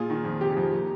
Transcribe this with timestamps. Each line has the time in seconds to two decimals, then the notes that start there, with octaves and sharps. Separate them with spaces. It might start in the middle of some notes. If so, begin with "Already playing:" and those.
Already playing: A#2 F4 G#4
0.10 D#3
0.24 F2
0.41 C3 G4
0.56 F2
0.72 A#3